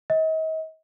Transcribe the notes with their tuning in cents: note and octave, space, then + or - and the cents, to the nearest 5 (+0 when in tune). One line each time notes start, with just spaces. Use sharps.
D#5 +40